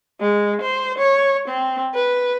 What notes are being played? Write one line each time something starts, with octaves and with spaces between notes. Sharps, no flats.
G#3
C5
C#5
C4
B4